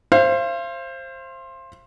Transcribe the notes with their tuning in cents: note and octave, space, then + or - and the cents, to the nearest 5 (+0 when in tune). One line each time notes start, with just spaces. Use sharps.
C5 +15 F5 -40